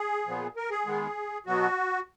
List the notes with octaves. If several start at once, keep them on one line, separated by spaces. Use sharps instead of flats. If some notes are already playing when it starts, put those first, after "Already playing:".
Already playing: G#4
A#2 F3 B3
A#4
G#4
D#3 G#3 B3
B2 F#3 B3 F#4